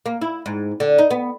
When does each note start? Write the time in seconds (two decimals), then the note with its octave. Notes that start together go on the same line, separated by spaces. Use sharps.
0.06 A#3
0.21 E4
0.46 G#2
0.80 D3
0.98 D#4
1.11 B3